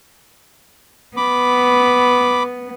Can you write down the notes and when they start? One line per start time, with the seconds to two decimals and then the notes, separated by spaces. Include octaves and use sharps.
1.17 B3 B5 D6